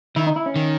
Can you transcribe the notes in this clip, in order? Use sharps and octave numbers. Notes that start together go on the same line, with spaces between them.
D#3 E4
D#4
E4
C#4
D#3